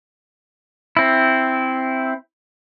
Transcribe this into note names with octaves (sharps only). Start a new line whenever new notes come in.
C4 E4